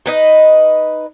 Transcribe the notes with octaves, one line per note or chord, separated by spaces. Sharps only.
D#4 B4 D#5